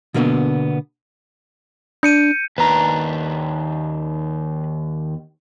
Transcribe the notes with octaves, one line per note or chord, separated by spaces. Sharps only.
B2 D3 A#3 B3 C#4 D4
D4 G6 C#7 D#7
D#2 D4 B4 A#5